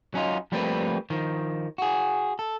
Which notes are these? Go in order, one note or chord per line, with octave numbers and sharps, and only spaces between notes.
F#3 C#4 D#4 F4
F3 G3 A3 A#3 C4 B4
D#3 F3
F#4 G#4
A4